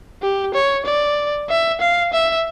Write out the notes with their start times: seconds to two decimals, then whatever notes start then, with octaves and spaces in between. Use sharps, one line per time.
0.22 G4
0.54 C#5
0.85 D5
1.49 E5
1.81 F5
2.13 E5